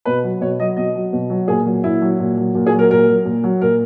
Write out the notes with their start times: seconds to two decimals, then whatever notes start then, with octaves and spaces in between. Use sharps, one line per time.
0.05 B2 B4
0.24 F#3
0.41 B2 C#5
0.60 F#3 D#5
0.77 B2 D#5
0.95 F#3
1.13 B2
1.30 F#3
1.48 A#2 G#4
1.65 F#3
1.84 A#2 E4
2.02 F#3
2.19 A#2
2.37 F#3
2.55 A#2
2.66 G#4
2.72 F#3
2.79 A#4
2.91 A#2 A#4
3.08 F#3
3.25 A#2
3.44 F#3
3.61 A#2 A#4